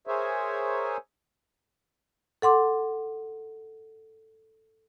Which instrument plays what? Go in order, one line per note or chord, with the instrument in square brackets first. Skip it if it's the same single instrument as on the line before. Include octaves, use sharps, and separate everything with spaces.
[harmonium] G#4 A#4 C5 C#5 E5 G#5
[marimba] A4 F#5 C6 D6